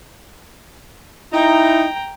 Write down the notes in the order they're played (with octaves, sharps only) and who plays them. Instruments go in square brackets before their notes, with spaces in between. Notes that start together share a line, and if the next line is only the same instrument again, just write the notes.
[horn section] D#4 [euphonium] E4 [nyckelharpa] G5 A#5